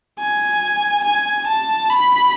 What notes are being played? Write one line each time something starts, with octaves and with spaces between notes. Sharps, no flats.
G#5
G#5
A5
B5